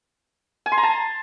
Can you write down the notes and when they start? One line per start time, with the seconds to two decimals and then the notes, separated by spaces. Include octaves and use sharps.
0.66 G#5
0.72 C6
0.78 A#5
0.83 A5